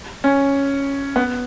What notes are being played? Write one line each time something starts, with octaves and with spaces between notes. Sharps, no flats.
C#4
B3